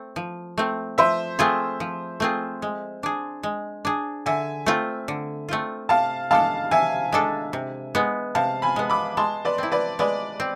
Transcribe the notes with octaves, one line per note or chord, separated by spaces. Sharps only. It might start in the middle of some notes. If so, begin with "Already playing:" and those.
Already playing: A3 C4
F3
A3 C4
F3 C5 E5
A3 C4 F4 G#4
F3
A3 C4 F4 G#4
G#3
D4 G#4
G#3
D4 G#4
D3 E5 G#5
A3 C4 F4
D3
A3 C4 F4
C3 F5 A5
G#3 D4 A4 F5 A5
C3 E5 G#5
G#3 D4 A4
C3
G#3 B3
C3 F5 A5
G#5 B5
G#3 B3
B5 D6
G#3 A5 C6
B4 D5
C4 E4
B4 D5
G#3 B4 D5
C4